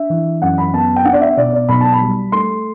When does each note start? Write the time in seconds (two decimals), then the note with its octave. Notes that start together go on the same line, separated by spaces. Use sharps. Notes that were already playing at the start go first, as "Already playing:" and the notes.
Already playing: D4 E5
0.10 E3
0.42 F#2 F#5
0.58 B5
0.73 B3 A5
0.96 G5
1.05 D4 F#5
1.13 D5
1.21 E5
1.37 B2 D5
1.53 D5
1.68 B1 B5
1.81 A5
1.93 B5
2.01 G3
2.32 A3 C6